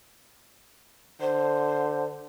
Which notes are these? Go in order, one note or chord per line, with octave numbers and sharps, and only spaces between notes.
D3 C5